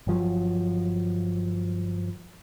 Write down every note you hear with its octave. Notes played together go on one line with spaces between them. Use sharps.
G1 F3 F#3